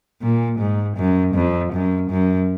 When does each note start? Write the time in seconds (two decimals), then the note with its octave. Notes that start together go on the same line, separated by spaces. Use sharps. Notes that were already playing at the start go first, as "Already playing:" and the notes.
0.22 A#2
0.59 G#2
0.97 F#2
1.35 F2
1.73 F#2
2.11 F#2